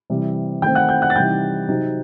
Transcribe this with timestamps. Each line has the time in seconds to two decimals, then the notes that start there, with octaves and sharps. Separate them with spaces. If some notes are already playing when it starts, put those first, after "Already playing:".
0.10 C3 E3 G3
0.62 D#3 A3 C4 G5 G6
0.75 F#5 F#6
0.89 G5 G6
1.02 F#5 F#6
1.10 A6
1.15 C3 E3 G3 D#4 G5 G6
1.69 C3 F#3 C4 D#4